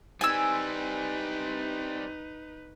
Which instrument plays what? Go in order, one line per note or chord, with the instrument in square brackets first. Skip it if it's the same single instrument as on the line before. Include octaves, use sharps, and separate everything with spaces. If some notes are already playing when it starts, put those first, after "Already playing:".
[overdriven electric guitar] G3 C4 [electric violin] D#4 B4 [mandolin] G#5 E6